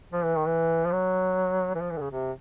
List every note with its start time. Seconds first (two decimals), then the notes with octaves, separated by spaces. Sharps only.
0.13 F3
0.24 E3
0.36 D#3
0.46 E3
0.86 F3
0.93 F#3
1.75 E3
1.81 F3
1.91 E3
1.97 D3
2.01 C#3
2.11 C3